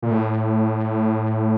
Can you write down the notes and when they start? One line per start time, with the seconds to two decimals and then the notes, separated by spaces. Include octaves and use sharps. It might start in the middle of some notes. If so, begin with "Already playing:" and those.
0.03 A#2
0.11 A2